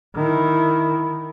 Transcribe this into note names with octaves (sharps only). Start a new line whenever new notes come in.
D#3 E4